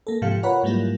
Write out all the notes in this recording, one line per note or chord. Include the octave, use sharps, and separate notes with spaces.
A#3 A4
G#2 C3 F3 G4 F5 C#7
F4 A#4 B4 C#5 F#5 B5
G#2 F#3 G3 A#3 E4 F4